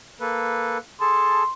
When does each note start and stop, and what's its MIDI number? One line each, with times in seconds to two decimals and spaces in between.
0.20 0.78 58
0.20 0.78 69
0.20 0.78 71
1.00 1.43 68
1.00 1.43 69
1.00 1.43 81
1.00 1.53 84